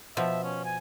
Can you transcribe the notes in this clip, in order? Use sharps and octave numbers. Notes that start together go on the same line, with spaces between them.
B2 F3 E5
C#4
G#5